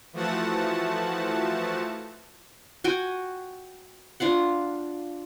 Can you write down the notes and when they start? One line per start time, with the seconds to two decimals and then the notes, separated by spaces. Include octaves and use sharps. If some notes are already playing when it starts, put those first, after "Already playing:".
0.13 E3 F3 A3 F#4 F#5 A5
2.84 F#4 G5 G#5
4.20 D4 F4 F5 F#5